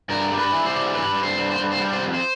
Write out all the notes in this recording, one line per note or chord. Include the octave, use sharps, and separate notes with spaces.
G2 A#4
G3
B4
E3
C5
G3
G2 B4
G2
C5
G2
C5
G2
C5
G3
C5
F2
C5